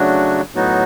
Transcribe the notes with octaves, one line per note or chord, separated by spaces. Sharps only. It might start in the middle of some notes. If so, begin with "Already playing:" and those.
Already playing: C#3 F#3 A3 D4 F#4
A2 F#3 B3 D#4 F#4